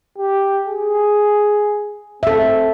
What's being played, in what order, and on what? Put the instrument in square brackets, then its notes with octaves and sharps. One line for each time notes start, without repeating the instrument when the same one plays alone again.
[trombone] G4
G#4
[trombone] C4 [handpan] A4 E5